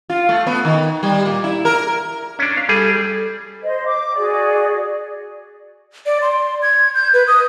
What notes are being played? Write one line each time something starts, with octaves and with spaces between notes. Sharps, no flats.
F4
A3
B3
D#3
G3
A#2
E4
A#4
C#4 D4
F5
G3 G#4 A4
C5 D#5
D6
F#4 G#4 D5
D5
C6
G#6
G6
B4
D#6